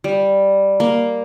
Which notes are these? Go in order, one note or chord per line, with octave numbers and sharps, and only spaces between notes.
G3
A#3